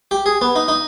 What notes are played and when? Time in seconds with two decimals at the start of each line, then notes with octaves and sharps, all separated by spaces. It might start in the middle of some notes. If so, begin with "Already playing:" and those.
0.11 G4
0.26 G#4
0.41 B3
0.56 D#4
0.68 D#4